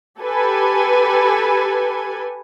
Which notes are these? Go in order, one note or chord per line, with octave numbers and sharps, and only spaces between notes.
G4 A4 B4 G#5